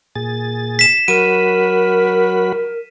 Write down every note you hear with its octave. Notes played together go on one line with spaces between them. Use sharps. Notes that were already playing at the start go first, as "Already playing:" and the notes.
A#2 G#4 A6
B6 E7
F#3 F#4 A#4 B5 D#7